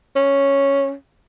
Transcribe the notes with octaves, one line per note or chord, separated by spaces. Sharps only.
C#4